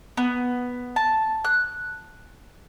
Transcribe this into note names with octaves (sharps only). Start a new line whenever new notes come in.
B3
A5
F#6